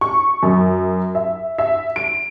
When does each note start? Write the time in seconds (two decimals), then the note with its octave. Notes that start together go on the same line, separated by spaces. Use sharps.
0.01 C#6
0.43 F#2
1.15 E5
1.58 E5
1.96 D7